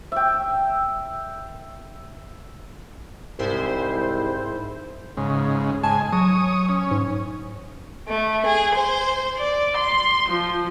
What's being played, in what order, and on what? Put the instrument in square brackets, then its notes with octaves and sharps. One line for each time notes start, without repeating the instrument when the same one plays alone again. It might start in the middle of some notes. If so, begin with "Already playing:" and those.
[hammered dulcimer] E5 G5
[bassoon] C2 [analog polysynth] G#2 E4 C5
[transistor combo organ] G#2 C#3
[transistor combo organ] G#2 G#5 [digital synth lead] A5
[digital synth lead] F#3 [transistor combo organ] C#5 D#6
[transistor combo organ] C#4
[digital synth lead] G#2
[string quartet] A3
G#4
C5
D5
C6
F3